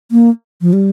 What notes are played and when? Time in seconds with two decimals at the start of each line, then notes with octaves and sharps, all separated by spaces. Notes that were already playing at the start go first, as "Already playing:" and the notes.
0.11 A#3
0.61 F3
0.73 G3